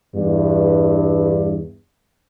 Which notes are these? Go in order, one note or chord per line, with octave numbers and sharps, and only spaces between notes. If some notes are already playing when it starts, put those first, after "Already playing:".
E2 G2